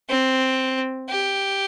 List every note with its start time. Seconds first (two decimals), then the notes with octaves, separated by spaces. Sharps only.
0.09 C4
1.09 G4